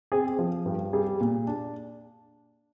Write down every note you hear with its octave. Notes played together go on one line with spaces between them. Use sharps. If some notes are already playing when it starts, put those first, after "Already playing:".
C4 G#4
F3
G2
G3 G#4
A#2
D4